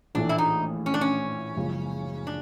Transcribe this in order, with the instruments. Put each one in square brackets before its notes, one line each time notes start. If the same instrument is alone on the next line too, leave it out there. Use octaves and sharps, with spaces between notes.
[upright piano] A#1 A2 E3 A3 [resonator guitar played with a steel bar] D4
[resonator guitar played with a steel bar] E4
D#4
C#4
D4
C#4
[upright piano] F#1 F#2 C#3 F3 G#3
[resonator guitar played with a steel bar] D4